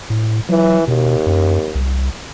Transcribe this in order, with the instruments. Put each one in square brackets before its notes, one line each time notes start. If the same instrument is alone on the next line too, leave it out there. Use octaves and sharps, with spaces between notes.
[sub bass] A2
[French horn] E3 [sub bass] F#3
[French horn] D#2 [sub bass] B2
[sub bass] F#2
C2